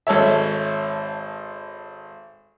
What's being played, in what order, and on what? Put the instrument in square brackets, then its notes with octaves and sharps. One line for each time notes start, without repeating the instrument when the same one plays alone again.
[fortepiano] G#1 A4 C#5 E5